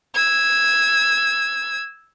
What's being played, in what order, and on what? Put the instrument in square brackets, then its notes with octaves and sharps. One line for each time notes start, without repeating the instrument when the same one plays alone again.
[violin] E6 G#6